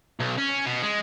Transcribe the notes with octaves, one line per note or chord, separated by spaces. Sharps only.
B1
C#4
B2
G#3